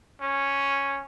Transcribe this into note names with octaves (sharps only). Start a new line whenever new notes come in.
C#4